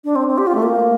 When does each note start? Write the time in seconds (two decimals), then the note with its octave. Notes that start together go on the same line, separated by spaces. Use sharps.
0.05 D4
0.16 C4
0.28 C4
0.38 G4
0.47 F4
0.55 A3
0.63 A#3